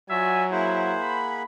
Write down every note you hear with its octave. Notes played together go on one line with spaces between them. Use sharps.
F#3 F4 F#4 D5 E5 G#5
A#3 E4 G#4 C5 F#5
B5